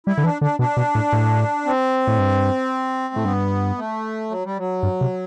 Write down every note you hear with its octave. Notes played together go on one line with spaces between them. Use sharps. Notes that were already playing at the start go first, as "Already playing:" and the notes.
G3 E4
D3
E3 D4
D3 D4
B2 D4
B2
A2
A2
C4
A2
G2
A2 A3
G2 B3
A3
F#3
G3
F#3
G2
C3